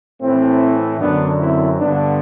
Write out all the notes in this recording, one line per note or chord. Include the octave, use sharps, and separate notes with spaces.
A2 E3 A3 C4
F#2 D3 B3 D4
C4 E4
G2 D3 B3 D4